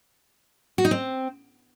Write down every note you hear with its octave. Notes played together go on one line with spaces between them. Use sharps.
F#4
D#4
C4